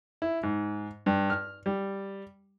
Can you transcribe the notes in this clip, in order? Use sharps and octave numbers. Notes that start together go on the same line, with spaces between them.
E4
G#2
G2
F6
G3